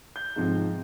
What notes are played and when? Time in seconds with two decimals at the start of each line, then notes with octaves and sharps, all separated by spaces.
0.16 G6
0.36 G#2 C3 F3 C4